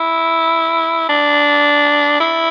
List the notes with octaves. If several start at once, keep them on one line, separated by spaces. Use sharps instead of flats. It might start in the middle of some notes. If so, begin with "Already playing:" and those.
Already playing: E4
D4
E4